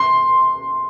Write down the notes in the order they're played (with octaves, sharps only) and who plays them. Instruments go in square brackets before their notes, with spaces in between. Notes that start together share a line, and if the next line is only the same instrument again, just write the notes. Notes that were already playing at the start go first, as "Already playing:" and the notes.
Already playing: [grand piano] C6